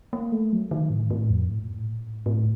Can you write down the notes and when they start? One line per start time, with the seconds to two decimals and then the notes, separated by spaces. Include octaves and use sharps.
0.13 A#3
0.32 A3
0.53 F#3
0.71 D#3
0.90 A2
1.11 A2
1.30 F2
1.49 A2
1.59 A#2
1.68 A2
1.86 A#2
2.06 A2
2.26 A2